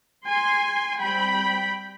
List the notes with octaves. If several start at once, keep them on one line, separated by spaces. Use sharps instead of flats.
G#5 C6
G3 C4 G5 B5